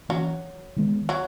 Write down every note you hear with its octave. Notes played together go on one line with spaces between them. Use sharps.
E3 F#3 A#3 C#4
D#3 G#3 B3
F#3